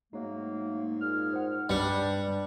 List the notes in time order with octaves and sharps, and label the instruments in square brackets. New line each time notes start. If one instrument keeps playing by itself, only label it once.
[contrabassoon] G#2 [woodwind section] F#3 A3 A#3 [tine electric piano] D#4
[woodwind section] A#2 G#4 F6
[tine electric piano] C5 F#5
[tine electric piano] G2 B4 C#7 [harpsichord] G3 [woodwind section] D4